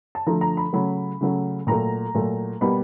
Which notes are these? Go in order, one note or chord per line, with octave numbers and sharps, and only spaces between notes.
A5
D3 F3 A3 A#5
A#5
B5
C#3 F#3 A3 B5
C#3 F#3 A3
A#2 F#3 A3 A#5
A#2 F#3 A3
B2 G3 A#3 B5